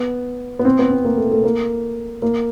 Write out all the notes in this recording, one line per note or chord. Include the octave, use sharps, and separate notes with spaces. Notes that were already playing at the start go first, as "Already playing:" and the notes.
Already playing: B3
B3
C4
B3
C4
A#3
A3
A3
A#3
A#3